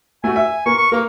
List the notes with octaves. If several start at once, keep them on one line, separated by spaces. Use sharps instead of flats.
A3 F#4 G#5
E5
A#3 C#6
C#6
A#3 A#4